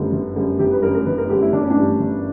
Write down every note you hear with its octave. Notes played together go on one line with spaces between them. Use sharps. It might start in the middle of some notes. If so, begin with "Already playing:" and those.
Already playing: G1 F#2 D3 G3
G1
F#2 D3 G3
G1 G4
B4
F#2 D3 G3 A#4
A#4
G1 B4
A#4
F#2 D3 G3 G4
E4
G1 D4
C#4
D4
G2 E3 G3
G1